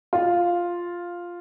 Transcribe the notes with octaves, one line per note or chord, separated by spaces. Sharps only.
F4